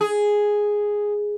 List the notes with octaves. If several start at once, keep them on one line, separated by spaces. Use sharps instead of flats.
G#4